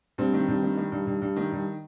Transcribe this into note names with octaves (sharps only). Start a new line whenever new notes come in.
G2 C4
D#3
G2
D#3
D#3
G2
G2
G2
D#3
G2